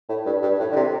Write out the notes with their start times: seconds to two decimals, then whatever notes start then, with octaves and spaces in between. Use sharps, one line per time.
0.09 A2
0.26 G2
0.42 G2
0.60 A2
0.72 D3
0.76 C3